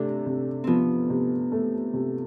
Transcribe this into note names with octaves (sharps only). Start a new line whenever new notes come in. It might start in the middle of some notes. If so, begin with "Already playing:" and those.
Already playing: C3 A3 D4
C3
F3 B3 C4
C3
A3
C3